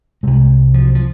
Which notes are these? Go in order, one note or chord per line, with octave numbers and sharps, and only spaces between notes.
C2 C3 G#3
F3
F3